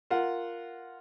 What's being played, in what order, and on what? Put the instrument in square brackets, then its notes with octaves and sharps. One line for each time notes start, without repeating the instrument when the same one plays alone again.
[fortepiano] F4 A#4 F#5